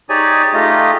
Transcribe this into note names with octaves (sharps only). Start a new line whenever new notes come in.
D#4 G4 G#4 C#5 D5 G#5
A3 D#4 F4 G4 G#4 D#5